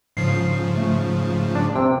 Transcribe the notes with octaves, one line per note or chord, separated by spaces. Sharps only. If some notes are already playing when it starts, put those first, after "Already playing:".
G#2 C#3 F3 C7
A3
D4
C3 G5